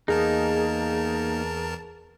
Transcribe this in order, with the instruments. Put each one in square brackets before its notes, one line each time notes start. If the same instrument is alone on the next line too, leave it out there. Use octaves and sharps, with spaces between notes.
[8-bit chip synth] E2 A#4 A5 [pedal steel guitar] A#3 D#4 [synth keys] G#4